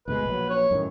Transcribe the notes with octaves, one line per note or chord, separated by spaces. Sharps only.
D2 B2 G#3 B4
A#1 F#3
C#5
F#2 A2 D#3